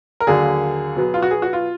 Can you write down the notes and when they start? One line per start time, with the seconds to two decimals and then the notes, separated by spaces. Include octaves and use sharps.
0.20 A#4
0.27 D#2 D3 F#3 A#3 G#4
0.96 B2 F#3 B3
1.14 F4
1.22 F#4
1.31 G#4
1.42 F#4
1.53 F4